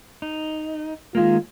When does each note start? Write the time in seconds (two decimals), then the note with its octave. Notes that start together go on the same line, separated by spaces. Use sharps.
0.22 D#4
1.15 D#3 G#3 A#3 F4